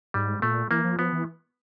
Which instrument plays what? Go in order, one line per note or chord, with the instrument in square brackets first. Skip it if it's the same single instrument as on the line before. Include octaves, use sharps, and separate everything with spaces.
[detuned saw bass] G#2 [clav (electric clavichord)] G3
[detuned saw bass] A#2 [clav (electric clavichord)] A3
[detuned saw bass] E3 [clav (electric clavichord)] A#3
[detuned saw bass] F3
[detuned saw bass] F3 [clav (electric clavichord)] B3
[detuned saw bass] E3